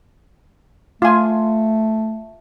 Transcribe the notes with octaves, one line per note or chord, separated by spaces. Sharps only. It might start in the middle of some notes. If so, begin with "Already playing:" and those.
A3 F4 G#5